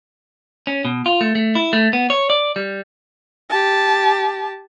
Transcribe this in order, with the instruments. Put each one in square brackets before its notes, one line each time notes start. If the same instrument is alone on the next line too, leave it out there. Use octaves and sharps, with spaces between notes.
[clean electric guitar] C#4
B2
F4
A3
A3
E4
A3
B3
C#5
D5
G3
[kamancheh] G4 A5